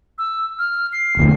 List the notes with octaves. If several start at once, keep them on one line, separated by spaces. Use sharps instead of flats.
E6
F6
C7
E1 D2